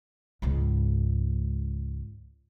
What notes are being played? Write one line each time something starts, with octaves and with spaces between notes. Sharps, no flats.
C#2 G#2